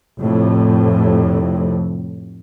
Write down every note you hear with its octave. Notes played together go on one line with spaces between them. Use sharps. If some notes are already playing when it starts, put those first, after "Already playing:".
F1 F2 A2